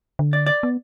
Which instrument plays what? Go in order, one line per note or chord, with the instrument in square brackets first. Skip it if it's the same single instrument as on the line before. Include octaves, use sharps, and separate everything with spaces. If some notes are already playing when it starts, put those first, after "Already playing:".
[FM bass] D3
[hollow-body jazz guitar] D5
D5
[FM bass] B3